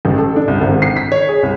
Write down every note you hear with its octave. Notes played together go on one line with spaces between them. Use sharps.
A1
A4
D4
C2
G#1
C7
B6
C#5
G#4
C2